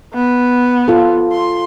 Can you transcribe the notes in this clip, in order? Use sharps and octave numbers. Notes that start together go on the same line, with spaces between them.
B3
F4 A4
C6